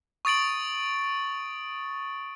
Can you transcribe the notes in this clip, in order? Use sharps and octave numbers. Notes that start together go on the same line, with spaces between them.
C#6 D#6 A6 D7 F#7